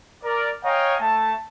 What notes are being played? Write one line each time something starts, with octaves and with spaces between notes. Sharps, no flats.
A#4 D5
C#5 D#5 F5 G5 G#5 A#5
A3 A5